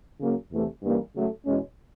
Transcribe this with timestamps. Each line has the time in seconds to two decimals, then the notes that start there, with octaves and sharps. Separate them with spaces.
0.20 C#3 F#3 A#3
0.52 E2 C3 E3 A3
0.83 G2 E3 G3 A#3 C#4
1.14 C#3 F#3 A3
1.46 E2 B2 G#3 C#4